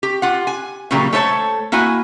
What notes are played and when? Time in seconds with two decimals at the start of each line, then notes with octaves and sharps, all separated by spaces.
0.03 G4
0.22 F4 F#5
0.47 G#5
0.91 A#2 C#3 E3 F#3 G3 A#3
1.13 A3 A4 C5 C#5 E5 A5
1.72 A#3 E4 F#4 G#5